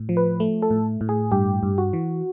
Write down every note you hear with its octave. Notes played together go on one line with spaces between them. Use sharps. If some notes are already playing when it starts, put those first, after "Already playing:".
Already playing: A2
F3
B4
A3
A4
A2
A2
G#4
G2 G4
G2
F#4
E3